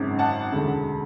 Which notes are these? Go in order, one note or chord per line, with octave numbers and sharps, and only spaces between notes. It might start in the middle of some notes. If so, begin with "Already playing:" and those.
Already playing: G#1 F#2 C#3
F#5 A5
E1 D2 C#3